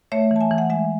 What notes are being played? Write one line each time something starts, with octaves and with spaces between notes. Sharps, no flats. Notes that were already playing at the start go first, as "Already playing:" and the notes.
A3 C#5 E5
E3 A5
E5 G#5
E3
F#5
G#3 E5 G#5